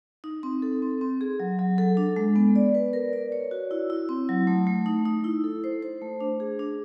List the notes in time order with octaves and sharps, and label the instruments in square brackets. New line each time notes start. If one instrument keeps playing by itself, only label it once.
[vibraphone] D#4
C4
A4
C4
C4
G#4
F#3
F#3
A4
D4
G#3
B3
D5
B4
A#4
D5
C#5
F#4
E4
E4
C4
F#3
A3
A3
D#4
D#4
E4
A4
C5
C5
A3
D4
G#4
D4